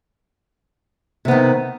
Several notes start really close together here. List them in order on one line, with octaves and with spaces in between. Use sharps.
C3 B3 D#3